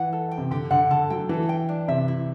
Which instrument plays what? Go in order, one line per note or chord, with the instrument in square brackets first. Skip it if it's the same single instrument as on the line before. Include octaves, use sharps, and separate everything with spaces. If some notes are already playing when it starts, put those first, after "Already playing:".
Already playing: [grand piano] E3 [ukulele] F#5
[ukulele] A4
G5
[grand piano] C3
[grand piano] D3 [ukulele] G4
[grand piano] D3 [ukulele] F#5
[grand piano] D3 [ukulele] A4
[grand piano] F#3 [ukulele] G5
[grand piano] E3 [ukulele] A4
[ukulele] G5
D4
[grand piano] C3 [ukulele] E5
[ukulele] E4